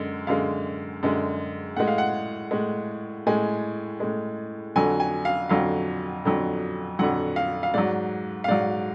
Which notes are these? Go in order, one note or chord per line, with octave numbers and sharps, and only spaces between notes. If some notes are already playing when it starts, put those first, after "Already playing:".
Already playing: F#2 D3 G#3
F#2 D3 G#3 F5
F#2 D3 G#3
A2 G#3 F#5
F5
F#5
A2 G#3
A2 G#3 G#5
A2 G#3
F2 D3 F#3 G#5
G#5
F5
F2 D3 F#3 F5
F2 D3 F#3
F2 D3 F#3 F#5
F5
F5
G#2 F#3 D5
F5
G#2 F#3 D5